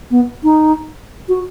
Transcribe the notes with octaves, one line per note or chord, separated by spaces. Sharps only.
B3
D#4
F#4